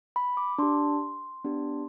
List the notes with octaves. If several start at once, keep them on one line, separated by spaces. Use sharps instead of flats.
B5
D6
D4 G4 C6
B3 D4 G4